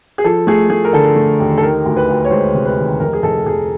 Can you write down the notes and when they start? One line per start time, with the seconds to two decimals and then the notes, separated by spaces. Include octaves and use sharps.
0.18 G#4
0.24 F3 A4
0.47 A3 G#4
0.70 A3 G#4
0.84 A#4
0.93 D3 A4
1.16 A3
1.40 D#2
1.58 A4
1.62 D#3 A#4
1.85 D2
1.97 B4
2.09 D2
2.25 C#5
2.31 G#3 C5
2.54 C3
2.65 B4
2.78 D#3
3.00 F1 A#4
3.13 G#4
3.23 F1 A4
3.46 F1 G#4